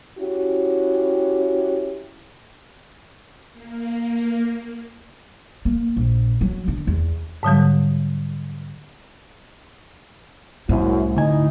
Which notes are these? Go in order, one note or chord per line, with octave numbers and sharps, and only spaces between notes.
C#4 E4 F#4 G4
A#3
A#3
A#1
F#3
D3
E2
G#2 D3 F#3 G3
C2 F#2 A2 E4
D2 D#4 E4 G#5